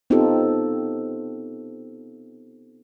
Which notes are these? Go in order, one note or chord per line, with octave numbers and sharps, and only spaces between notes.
B3 C4 D#4 F4 G4 A4